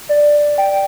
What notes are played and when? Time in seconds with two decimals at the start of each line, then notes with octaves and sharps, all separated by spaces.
0.09 D5
0.58 G5